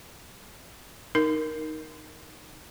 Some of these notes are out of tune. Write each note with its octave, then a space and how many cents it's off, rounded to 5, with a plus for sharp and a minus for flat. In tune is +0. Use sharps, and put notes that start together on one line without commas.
D#4 +0 A#4 +0